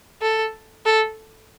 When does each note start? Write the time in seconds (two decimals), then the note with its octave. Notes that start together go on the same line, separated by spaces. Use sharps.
0.22 A4
0.85 A4